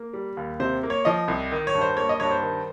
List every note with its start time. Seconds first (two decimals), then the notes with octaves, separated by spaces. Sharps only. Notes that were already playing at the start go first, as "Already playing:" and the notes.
Already playing: A#3
0.13 G3
0.37 D#2
0.60 C3 C5
0.83 A#3
0.90 C#5
1.05 F3 D#5
1.28 C2
1.52 D#3
1.67 C#5
1.75 G2
1.81 C5
1.97 A#3 C#5
2.09 D#5
2.20 G2 C#5
2.31 C5
2.42 D#3